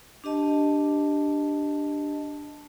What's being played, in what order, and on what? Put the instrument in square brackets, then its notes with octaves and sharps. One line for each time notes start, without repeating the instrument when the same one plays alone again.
[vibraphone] D4 G4 D#5 A5